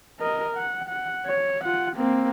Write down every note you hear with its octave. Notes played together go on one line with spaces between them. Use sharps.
A#4 D#5
F#5
F#5
C#5
F4 F#5
A#3 C4